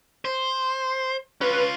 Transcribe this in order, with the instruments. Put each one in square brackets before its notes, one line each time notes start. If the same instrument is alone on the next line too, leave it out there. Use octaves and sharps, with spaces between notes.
[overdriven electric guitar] C5
[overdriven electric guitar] C#4 F4 [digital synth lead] B4